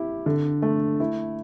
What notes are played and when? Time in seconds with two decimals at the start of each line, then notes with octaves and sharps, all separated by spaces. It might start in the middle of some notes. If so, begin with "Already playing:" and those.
Already playing: E4 G4
0.26 D3
0.62 A3
1.00 E4